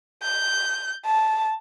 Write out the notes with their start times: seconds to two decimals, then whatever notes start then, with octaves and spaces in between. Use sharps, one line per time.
0.23 G6
1.06 A5